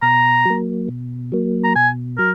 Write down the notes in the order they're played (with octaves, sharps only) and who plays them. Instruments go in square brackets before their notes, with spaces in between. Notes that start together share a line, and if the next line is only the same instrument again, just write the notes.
[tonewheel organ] B2 [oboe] A#5
[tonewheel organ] F#3 A#3
B2
F#3 A#3
[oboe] A#5
[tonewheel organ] B2 [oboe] G#5
[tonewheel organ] F#3 [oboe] A#4